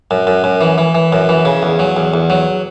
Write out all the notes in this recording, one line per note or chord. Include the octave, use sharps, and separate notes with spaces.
F#2
F#2
F#2
E3
E3
E3
F#2
E3
C#3
E2
F#3
E2
E2
F#3